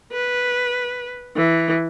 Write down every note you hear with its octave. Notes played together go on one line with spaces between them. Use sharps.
B4
E3